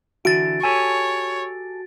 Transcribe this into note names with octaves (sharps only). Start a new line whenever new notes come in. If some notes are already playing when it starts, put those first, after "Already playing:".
D3 E3 E4 F#4 A6 D7
G4 A4 C#5 G#5